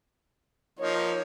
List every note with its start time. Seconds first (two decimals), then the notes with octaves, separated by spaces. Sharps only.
0.79 F3 A#3 D#4 C#5